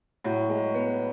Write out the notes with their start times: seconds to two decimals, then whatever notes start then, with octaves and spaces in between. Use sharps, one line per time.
0.24 A2 F#3
0.49 G#3
0.74 B3